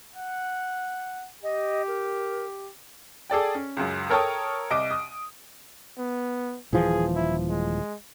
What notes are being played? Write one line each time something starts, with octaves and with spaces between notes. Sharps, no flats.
F#5
G4 D#5
A#4
G#4 A4 D5 G5
C#4
C#2 F#2
A4 A#4 C#5 G5 A5 D#6
C2 D#5 D6 D7
D#6
B3
D#1 E3 F3 G#4
E4
G#3